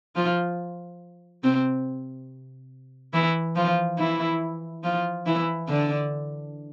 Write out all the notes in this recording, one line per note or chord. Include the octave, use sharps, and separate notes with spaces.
F3 F4
C3 C4
E3 E4
F3 F4
E3 E4
F3 F4
E3 E4
D3 D4